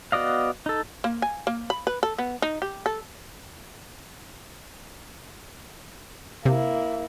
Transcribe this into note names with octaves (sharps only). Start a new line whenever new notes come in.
B3 F#4 D5 D#5 F5
D#4 A4
A#3
G#5
A#3
B5
B4
A4
B3
D#4
G4
A4
C3 A#3 E4